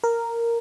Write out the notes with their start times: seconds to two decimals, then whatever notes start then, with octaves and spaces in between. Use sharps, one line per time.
0.04 A#4